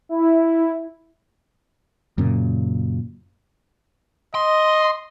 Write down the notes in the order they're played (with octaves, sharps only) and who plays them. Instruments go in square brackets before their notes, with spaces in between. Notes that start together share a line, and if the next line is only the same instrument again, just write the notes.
[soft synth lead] E4
[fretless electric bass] F#2 A#2 C#3
[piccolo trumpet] D#5 [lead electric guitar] C6